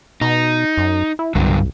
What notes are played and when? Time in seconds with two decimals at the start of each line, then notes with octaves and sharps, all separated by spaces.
0.21 B2 D#4
0.78 F#2
1.19 E4
1.35 C2 G2 D3 F#3